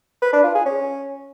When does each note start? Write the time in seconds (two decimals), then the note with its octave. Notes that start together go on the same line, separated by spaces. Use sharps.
0.22 B4
0.33 D4
0.44 F4
0.55 G#4
0.66 C#4